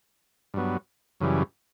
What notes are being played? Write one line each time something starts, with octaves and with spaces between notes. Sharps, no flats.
G2 F#3 B3
F#2 C#3 E3 G3